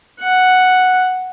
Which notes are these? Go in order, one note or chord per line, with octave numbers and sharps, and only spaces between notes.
F#5